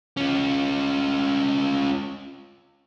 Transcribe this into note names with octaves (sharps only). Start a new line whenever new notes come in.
C#4 F4